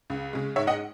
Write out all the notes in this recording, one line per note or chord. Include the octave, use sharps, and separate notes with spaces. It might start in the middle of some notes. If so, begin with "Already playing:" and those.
C#2
C#3 G#3
G#2 C#5 E5
D#5 F#5